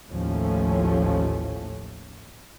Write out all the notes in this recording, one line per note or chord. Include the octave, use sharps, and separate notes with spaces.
A1 D#2 A2 F3 A3 C#4